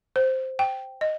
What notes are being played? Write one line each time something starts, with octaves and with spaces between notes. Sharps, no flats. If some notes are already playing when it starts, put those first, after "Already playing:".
C5
G5
D#5